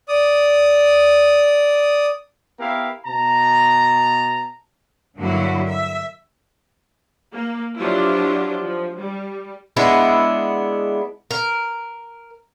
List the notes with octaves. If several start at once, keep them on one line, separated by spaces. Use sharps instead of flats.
D5 D#6
B3 E4 G4 A#4 F5
B2 A5 A#5
G2 D3 F#3 A#3 E4 F#4
E5
A#3
F3 F#3 D4 E4 F4 G4
F3
G3
G#3 B3 D4 E4
A#4